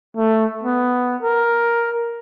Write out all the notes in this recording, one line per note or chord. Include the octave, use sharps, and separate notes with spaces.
A3
B3
A#4